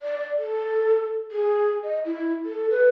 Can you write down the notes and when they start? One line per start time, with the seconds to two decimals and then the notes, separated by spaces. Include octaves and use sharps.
0.01 D5
0.38 A4
1.31 G#4
1.83 D#5
2.06 E4
2.45 A4
2.70 B4